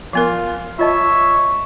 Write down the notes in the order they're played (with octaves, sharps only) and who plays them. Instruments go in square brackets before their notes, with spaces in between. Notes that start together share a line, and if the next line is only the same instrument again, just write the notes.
[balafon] F3 B3 A#4 [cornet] F4
[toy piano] F4 D#5 A5 [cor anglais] C#5 [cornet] E5